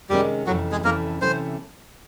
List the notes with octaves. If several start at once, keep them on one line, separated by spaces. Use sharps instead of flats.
C3 D#3 G3 G#3 C#4 G4
F2 C3 E3 F#3 A3 C#4 F#4
G#3 G#4
F2 C3 E3 A3 A#3 C#4 A#4
C3 E3 A3 C#4 C5